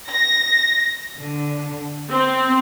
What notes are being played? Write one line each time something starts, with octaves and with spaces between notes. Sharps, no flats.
A#6
D3
C4